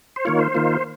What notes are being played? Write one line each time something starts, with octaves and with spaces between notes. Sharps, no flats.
C5
D#3 A#3 F4 C#5
C5
D#3 A#3 F4